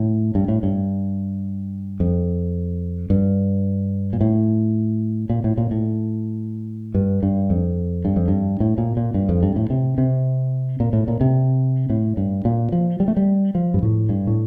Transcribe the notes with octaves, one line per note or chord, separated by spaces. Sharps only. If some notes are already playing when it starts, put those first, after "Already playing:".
Already playing: A2
G2
A2
G2
F2
G2
A#2
A2
A#2
A2
A#2
A2
G2
G2
F2
G2
F2
G2
A2
A#2
A#2
G2
F2
G2
A2
C3
C3
A#2
A2
A#2
C3
A2
G2
A#2
F3
G3
A3
G3
F3
G2
A2
G2
A2